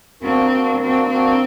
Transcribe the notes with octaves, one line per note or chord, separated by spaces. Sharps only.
A#3 C4 D4 F#4 A#4
A#3 D4 F#4 A#4
A#3 C4 D4 F#4 A#4
A#3 C4 D4 F#4 A#4